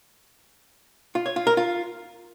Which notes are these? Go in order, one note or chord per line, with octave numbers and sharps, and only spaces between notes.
F4
C#5
F4
A#4
F4